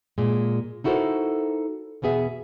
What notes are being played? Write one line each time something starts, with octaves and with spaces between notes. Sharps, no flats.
A#2 G#3
D#4 E4 F#4 A4 A#4 C5
E2 B2 B3 G#4 E5